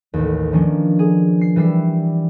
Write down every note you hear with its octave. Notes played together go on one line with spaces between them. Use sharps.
A1 D#2
D#3 F3 A#3 C#4 D4
G#4
C7
E3 G3 E5 C7